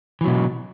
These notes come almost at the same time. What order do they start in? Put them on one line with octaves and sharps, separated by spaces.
E3 F#3 B2